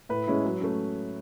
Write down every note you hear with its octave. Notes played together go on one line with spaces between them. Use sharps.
A2 B4
G#3 C#4 E4
F#3
A3 C#4